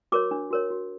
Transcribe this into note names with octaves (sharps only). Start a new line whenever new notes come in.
F#4 A#4 C#5 D6
D4
F#4 A#4 C#5
F#4